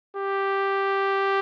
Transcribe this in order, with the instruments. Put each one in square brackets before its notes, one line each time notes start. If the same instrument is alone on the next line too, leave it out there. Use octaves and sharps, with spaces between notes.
[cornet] G4